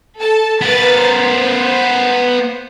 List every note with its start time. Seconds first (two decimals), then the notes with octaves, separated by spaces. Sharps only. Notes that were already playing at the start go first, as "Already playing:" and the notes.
0.19 A4 A5
0.61 B3 A#4 B4 A6
1.00 C5